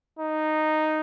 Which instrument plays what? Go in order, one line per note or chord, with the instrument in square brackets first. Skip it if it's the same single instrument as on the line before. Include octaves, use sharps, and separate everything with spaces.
[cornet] D#4